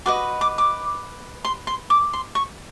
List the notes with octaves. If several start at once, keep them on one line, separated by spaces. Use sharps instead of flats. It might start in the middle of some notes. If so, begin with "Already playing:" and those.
F#4 B4 D#5 D6
D6
D6
C6
C6
D6
C6
C#6